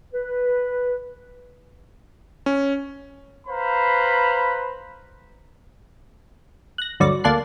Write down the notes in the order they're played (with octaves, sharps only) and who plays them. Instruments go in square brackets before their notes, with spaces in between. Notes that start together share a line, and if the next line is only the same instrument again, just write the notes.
[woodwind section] B4
[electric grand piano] C#4
[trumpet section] B4 C5 F5 A#5 B5
[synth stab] F#6 A#6
D2 G2 F#3 D5 C#6
D2 A#3 D5 A5 F#6 C7